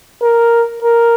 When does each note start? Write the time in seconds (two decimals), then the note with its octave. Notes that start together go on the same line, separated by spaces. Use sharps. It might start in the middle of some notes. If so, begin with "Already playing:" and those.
0.22 A#4
0.83 A#4